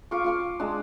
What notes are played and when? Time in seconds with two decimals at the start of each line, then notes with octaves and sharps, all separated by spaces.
0.11 F4 F5 C#6 D6
0.24 F4 F5 D6
0.60 G#3 D4